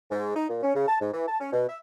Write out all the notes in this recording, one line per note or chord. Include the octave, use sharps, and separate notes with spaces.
G#2
D#4
A#2
C#4
C#3
A5
G#2
E3
A5
C#4
B2
E5